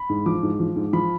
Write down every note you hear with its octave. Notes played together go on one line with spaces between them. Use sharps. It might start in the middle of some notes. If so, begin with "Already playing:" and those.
Already playing: B5
G#2
F3 D6
G#2
F3
G#2
F3 B5